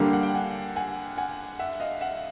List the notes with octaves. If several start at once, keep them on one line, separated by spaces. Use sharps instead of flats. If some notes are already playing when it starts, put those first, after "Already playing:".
Already playing: D3 G3 A#3 F5 G5
F#5
G5
F#5 G#5
F#5 G#5
F#5 G#5
E5 F#5
D#5 F5
E5 F#5